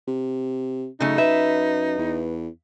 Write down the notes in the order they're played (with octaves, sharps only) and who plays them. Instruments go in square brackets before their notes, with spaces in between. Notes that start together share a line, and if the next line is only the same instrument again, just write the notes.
[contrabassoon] C3
[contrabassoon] F#2 [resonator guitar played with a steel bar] C#3 A3 [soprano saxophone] D#4
[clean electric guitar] B4 [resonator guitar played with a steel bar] E5
[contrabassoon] E2